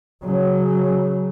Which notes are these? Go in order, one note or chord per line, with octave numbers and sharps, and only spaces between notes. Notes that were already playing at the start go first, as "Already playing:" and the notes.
C#3 F#3